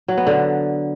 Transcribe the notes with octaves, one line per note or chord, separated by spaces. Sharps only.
F#3
B3
D3